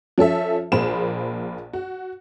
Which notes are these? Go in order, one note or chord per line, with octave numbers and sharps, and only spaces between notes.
F3 C#4 A4 E5
A#1 A#3 G#4 C5 B5 E7
F#4